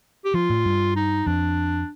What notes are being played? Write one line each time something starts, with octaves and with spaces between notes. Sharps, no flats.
G4
F3 F4
A2
G2
D#4
F2 D4